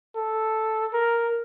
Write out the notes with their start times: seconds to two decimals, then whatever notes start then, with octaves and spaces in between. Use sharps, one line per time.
0.16 A4
0.93 A#4